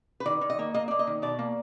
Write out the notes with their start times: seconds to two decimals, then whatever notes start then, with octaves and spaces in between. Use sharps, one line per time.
0.20 B4
0.26 D#3 D5
0.41 D#3
0.50 D#5
0.59 A#3
0.74 A#3 D#5
0.88 A#3 D5
0.99 D#5
1.07 D#3
1.22 B2 D5
1.39 A#3